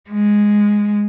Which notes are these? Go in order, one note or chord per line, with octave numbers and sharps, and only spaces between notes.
G#3